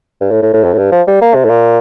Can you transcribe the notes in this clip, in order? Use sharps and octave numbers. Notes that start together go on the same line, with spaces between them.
G2
A2
A2
A2
F2
A2
G2
F3
G3
A#3
C3
A2
A#2